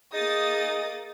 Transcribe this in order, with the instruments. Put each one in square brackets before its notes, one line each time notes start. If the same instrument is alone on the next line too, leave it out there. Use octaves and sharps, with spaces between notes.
[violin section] A#3 D#6 A6 [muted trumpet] D#4 [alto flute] G#4 [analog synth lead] D#5